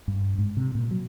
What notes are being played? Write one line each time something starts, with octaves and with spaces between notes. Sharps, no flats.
G2
G#2
C3
A#2
F#3